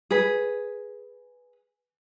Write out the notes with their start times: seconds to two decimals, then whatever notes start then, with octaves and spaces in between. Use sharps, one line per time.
0.11 G#4 B4